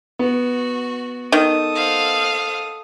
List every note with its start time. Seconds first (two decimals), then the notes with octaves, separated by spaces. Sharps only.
0.19 B3 F#4
1.32 D#3 A4 D#6
1.72 C5 F5 F#5